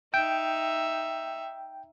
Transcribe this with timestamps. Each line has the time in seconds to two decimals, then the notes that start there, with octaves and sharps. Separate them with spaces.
0.14 D#4 E5 G5